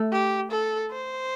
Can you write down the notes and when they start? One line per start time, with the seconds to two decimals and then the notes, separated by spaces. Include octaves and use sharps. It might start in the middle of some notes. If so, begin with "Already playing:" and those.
Already playing: A3
0.12 G4
0.51 A4
0.92 C5